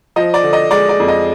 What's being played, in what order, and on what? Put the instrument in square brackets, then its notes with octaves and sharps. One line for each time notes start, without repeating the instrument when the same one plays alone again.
[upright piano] F3 D#5
D5
D3
D#5
G#3 D5
D5
F2
D#5